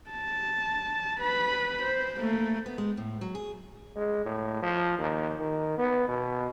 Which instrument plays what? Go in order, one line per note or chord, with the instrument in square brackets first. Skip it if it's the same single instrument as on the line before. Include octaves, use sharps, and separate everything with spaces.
[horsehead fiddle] A5
B4 B5
C5
A3 A#3
[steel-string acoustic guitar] B3
G#3
A2
F#3
G#4
[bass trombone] G#3
A2
F3
D#2
D#3
B3
B2